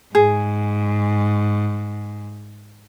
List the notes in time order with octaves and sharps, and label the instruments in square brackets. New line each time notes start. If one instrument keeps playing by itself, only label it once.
[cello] G#2 [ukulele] G#4